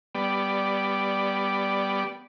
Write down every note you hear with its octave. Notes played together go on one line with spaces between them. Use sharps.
G3 B3 D5